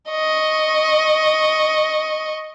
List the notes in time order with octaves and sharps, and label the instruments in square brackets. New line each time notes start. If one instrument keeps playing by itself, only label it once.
[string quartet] D#5 C#6